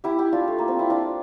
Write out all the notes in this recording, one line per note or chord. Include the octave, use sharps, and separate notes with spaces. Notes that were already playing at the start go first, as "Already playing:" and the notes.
E4 G4
E4 G4
D4 F4
A3
A#3
C4
E4
D4 F4